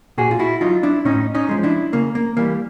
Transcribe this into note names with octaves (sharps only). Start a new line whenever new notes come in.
A#2 F#4 G#4
F4
E4 F#4
F#3 D#4 F4
D4 E4
A2 C#4 D#4
C#4 D#4
F3 G#3
D4 E4
C#3 A#3
A#3
E3 G3 A#3